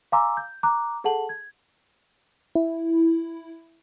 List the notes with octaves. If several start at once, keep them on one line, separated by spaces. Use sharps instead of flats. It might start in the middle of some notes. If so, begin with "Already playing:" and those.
F5 G#5 A#5 C6 D6 E6
G6
A#5 D6 F#6
G#4 A4 F#5 A5 F#7
G#6
E4